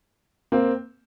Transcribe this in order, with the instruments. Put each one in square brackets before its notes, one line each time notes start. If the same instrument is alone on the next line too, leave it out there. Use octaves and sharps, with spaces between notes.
[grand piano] A#3 C4